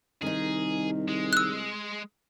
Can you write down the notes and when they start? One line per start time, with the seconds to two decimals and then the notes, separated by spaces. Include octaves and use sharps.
0.22 C2 D#3 D#4 G#4
1.09 G#3
1.33 E6 F#6